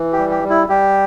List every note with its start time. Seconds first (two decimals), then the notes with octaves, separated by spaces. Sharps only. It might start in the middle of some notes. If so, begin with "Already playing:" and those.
Already playing: E3
0.13 G4
0.18 G3
0.31 G4
0.43 G3
0.50 E4
0.69 G3 G4